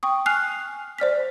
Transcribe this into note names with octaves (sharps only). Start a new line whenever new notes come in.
G5 C#6 D#6
G#5 F6 F#6 C7 F7
C5 D5 F6 B6